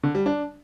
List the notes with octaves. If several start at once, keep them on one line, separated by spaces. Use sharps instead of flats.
D3
G3
D4